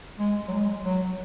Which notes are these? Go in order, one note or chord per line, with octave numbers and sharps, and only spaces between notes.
G#3
F#3
G#3
F#3